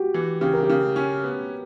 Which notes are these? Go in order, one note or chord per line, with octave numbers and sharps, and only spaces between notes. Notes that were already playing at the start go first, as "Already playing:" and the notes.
Already playing: F#4 G4
E3
C#3 G4
A#4
G4
C#3
C#4
B3